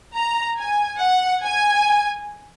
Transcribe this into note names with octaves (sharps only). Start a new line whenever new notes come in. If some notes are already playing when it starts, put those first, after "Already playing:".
A#5
G#5
F#5
G#5